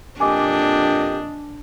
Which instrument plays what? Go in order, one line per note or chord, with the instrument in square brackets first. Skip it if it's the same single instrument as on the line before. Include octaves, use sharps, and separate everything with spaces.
[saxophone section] F2 A#2 D#5 [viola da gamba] D4 [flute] G4 [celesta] G#5 D6